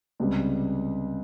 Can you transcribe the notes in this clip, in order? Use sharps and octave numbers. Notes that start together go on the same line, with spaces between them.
C#2 C3 G3